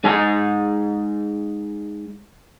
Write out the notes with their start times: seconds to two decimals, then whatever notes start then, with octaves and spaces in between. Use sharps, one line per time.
0.04 G#3 D#4 D#5 G#5